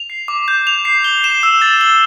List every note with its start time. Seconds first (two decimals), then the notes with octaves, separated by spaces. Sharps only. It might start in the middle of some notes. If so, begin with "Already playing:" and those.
Already playing: F7
0.10 C7
0.28 D6
0.48 G6
0.67 F7
0.85 C7
1.04 G7
1.24 E7
1.43 E6
1.62 A6
1.81 G7